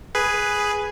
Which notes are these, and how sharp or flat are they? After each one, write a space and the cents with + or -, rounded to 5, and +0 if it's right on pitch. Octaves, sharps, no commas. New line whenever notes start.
G#4 +0 B4 +0